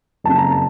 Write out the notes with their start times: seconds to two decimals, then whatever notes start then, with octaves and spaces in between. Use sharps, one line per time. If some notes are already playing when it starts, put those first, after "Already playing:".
0.24 F#1 F2 C#3 A5
0.38 A#5
0.51 A5